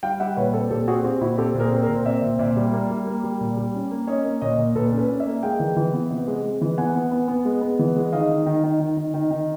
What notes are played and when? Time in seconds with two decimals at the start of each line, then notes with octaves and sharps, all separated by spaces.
0.03 G3 F5 G5
0.20 G3 E5 F#5
0.37 A#2 B4 C#5
0.53 C4 A4 B4
0.70 A#2 G4 A4
0.87 C4 F#4 G#4
1.04 C4 F4 G4
1.21 A#2 E4 F#4
1.38 C4 G4 A4
1.55 A#2
1.60 G#4 A#4
1.72 C4
1.83 A#4 C5
1.89 A#2
2.05 C4 D5 E5
2.22 A#2
2.39 A#2 D5 E5
2.57 G3
2.73 A#3
2.90 G3
3.07 A#3
3.24 G3
3.41 A#2
3.57 G3
3.74 C#4
3.91 A#3
4.07 C#4 C#5 D#5
4.25 A#3
4.41 A#2 C#5 D#5
4.58 A#2
4.75 A#2 A4 B4
4.92 C#4
4.98 A4 B4
5.09 C#4
5.20 D5 E5
5.26 A#3
5.43 G#3 F5 G5
5.60 E3
5.76 E3
5.94 B3
6.11 C3
6.27 G#3
6.44 G#3
6.61 E3
6.78 B3 F#5 G#5
6.95 B3
7.12 B3
7.28 B3
7.45 G#3
7.62 B3
7.79 E3
7.96 G#3
8.12 D#3 D#5 F5
8.29 D#3
8.46 D#3
8.64 D#3
8.80 D#3
8.97 D#3
9.14 D#3
9.31 D#3